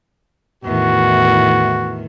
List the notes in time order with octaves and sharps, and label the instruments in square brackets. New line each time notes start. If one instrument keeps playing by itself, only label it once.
[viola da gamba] E2 A2 D#3 [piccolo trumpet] F#4